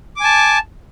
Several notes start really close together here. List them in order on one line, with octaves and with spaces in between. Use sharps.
D6 G#5 A5